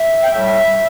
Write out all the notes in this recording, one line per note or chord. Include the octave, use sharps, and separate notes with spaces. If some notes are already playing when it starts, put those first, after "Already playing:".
Already playing: E5
G5
A2 G3 E5